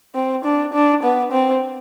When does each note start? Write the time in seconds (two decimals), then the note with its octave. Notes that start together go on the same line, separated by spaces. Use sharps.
0.15 C4
0.45 D4
0.73 D4
1.03 B3
1.32 C4